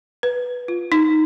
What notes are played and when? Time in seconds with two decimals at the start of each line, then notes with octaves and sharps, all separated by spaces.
0.23 B4
0.68 F4
0.92 D#4